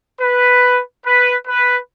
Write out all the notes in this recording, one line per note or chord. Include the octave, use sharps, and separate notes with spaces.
B4
B4
B4